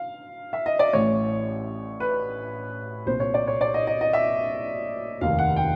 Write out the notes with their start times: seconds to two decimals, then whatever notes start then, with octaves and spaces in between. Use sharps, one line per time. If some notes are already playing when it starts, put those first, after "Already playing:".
Already playing: F5
0.53 E5
0.66 D#5
0.79 D5
0.93 A1 A2 E3 C#5
2.00 B4
3.06 C2 A#2 C5
3.20 C#5
3.34 D5
3.48 C#5
3.61 D5
3.74 D#5
3.87 D#5
4.01 D#5
4.13 E5
5.21 F1 D#2 D#3 F5
5.39 F#5
5.56 G5